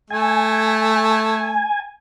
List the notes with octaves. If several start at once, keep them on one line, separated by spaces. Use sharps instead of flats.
A3 G#5